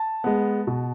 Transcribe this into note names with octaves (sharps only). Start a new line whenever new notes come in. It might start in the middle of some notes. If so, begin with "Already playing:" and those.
Already playing: A5
G#3 B3
B2